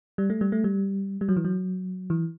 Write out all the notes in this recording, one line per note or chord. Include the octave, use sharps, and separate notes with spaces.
G3
A3
G3
A3
G3
G3
F#3
E3
F#3
E3